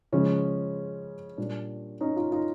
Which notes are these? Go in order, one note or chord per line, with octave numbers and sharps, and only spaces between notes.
C#3 F3 G#3 C#4
A#2 G3 D4
C#4 D#4
D#4 F4
D#4 F4